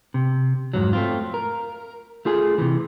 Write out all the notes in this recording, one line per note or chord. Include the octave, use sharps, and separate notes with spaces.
C3
F2 G#2 F#3
A3 C4 F4
A#4
A3 F4 G#4 G#5
C3 E3